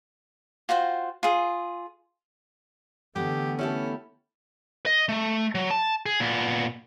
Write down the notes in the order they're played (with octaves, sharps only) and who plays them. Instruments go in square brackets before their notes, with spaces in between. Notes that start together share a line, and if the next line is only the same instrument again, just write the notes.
[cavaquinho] F4 F#4 C5 G5
F4 G#4
[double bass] D3 E3 [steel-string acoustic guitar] A3 B3 [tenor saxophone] G4
[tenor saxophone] C#4 [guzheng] E4 G4 A4
[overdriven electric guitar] D#5
A3
F#3
A5
G#4
A#2 B3